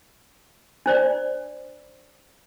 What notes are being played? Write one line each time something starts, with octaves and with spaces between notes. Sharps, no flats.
D4 C5 D5